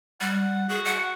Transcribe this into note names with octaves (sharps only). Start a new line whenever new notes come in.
G3 F#5
F#4 G#4
F#5